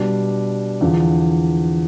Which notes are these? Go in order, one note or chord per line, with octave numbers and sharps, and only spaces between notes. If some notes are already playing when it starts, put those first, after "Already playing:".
Already playing: B2 G3 D4
E2 D3 F3